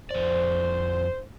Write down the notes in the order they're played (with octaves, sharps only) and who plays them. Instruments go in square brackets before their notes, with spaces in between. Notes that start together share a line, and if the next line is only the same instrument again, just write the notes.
[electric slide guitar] F2 D5 [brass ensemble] C5